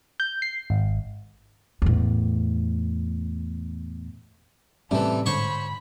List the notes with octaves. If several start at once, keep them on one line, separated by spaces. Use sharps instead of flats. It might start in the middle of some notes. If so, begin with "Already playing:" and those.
G6
C7
G#1
E2 A2
A2 C3 E3 G3 C#4 G4 A4 D5
G#2 D3 C5 C#5 B5 C#6